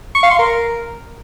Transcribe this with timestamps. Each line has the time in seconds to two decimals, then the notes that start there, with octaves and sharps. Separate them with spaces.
0.15 C#6
0.23 F5
0.31 C6
0.39 A#4